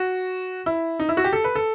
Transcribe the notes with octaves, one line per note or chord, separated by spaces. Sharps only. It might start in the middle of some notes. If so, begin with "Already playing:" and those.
Already playing: F#4
E4
D#4
E4
F#4
G4
A4
B4
A4